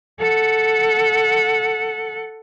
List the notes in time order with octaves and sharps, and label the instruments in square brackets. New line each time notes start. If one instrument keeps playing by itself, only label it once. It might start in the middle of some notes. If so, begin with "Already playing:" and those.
[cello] A4 F#5